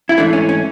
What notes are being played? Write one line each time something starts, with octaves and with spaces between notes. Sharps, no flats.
E4
G#2 E3 A3 D4
C#4
C#4